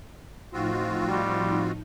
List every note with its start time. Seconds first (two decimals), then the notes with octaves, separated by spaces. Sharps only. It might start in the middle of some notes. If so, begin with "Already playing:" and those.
0.53 A2 F3 C4 D#4 F4 F#4
1.08 G3